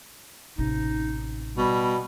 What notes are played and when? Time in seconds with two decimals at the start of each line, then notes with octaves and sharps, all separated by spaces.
0.58 A1 C3 D#4
1.57 B2 G3